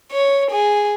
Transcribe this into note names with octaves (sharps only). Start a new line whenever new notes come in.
C#5
G#4